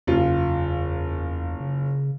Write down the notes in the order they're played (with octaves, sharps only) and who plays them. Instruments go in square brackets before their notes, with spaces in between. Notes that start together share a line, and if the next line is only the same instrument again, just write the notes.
[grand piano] F#1 F4 [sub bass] E2
[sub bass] C#3